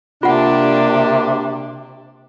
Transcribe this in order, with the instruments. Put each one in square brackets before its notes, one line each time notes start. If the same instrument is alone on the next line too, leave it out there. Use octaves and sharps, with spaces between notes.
[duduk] C3 [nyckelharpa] A#3 G4 [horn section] D4 [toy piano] F4 F#5